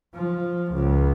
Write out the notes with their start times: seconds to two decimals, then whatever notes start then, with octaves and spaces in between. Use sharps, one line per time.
0.15 F3
0.73 C#2